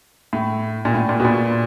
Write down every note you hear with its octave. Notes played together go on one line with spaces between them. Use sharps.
A2
A#2
A2
A#2
B2
A#2